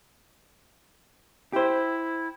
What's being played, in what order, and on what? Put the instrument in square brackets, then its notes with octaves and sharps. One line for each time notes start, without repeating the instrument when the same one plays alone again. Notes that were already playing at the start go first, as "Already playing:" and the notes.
[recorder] E4 [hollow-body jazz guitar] G4 C5